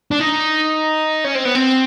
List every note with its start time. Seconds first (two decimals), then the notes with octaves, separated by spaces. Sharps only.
0.11 D4
0.19 D#4
1.25 C#4
1.35 C4
1.45 B3
1.55 C4